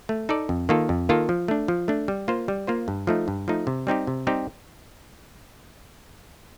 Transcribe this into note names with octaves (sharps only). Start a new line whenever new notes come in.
A3
D#4 A4 D5
F2
D#3 A#3 F4 A4
F2
D#3 A#3 F4 A4
F3
A3 D4
F3
A3 D4
G3
A#3 F4 C5
G3
A#3 F4 C5
G2
F3 A3 D#4
G2
F3 A3 D#4
C3
G3 C4 D#4 G4
C3
G3 C4 D#4 G4